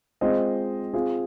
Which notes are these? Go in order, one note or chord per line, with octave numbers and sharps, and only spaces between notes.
G#3 C4 F4 C5 D#5
C4 F4 G#4